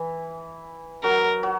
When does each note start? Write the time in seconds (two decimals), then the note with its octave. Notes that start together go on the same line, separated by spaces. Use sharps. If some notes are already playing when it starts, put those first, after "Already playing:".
Already playing: E3
1.03 F#3 A#4
1.43 F#3